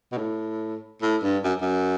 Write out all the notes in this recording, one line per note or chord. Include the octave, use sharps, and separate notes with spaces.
B2
A2
A2
G2
F#2
F#2